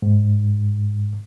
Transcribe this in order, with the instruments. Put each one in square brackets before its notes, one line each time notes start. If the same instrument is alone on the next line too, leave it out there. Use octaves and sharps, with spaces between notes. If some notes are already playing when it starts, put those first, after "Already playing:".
[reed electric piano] G#2